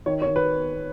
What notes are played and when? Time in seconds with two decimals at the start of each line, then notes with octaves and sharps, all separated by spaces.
0.06 D#3 C#5
0.22 C#5
0.26 D#3
0.36 B4